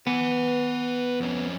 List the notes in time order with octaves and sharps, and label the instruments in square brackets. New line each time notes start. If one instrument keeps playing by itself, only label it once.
[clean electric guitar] B3 [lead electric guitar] B4 G#5
[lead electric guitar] F2 C#4